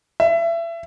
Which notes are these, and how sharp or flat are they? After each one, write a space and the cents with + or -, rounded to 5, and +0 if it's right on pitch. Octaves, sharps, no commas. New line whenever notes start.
E5 +30